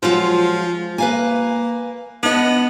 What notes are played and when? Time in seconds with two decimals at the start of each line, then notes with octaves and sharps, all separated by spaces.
0.03 F3 F#3 G#3 F4
0.98 A#3 B4 F5 G#5
2.23 B3 D4 D#5